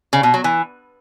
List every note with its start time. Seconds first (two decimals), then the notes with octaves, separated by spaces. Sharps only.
0.13 C#3
0.23 B2
0.34 F#3
0.44 E3